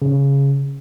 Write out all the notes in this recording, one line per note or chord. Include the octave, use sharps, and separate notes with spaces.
C#3